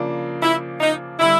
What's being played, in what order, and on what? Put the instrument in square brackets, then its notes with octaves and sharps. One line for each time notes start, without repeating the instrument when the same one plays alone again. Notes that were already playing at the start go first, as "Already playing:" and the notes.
Already playing: [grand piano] C#3 F3 A#3 D4
[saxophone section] E4
D#4
[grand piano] D3 G3 [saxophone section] E4